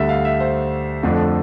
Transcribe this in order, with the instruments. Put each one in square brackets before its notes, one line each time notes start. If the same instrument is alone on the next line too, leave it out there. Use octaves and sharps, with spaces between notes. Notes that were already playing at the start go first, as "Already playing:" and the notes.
Already playing: [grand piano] D2 D3 G3 E5
F5
E5
C5
F2 D3 F3 A3 D4